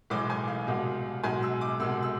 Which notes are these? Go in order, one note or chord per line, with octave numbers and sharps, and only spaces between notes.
B1 A2 E3 G#3 D6
G#5
F5
C2 B2 G#3
B1 B2 G#3 G#5
E6
D6
C2 B2 G#3 E6
E6